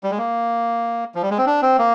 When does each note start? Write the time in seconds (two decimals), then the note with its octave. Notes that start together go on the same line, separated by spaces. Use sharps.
0.04 G3
0.11 G#3
0.18 A#3
1.15 F3
1.22 G3
1.31 G#3
1.38 C4
1.46 D4
1.62 C4
1.79 A#3